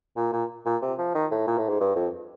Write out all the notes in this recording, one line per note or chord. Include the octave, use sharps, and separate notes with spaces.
A#2
A#2
A#2
C3
F3
D#3
A2
A#2
A2
G#2
G2
F2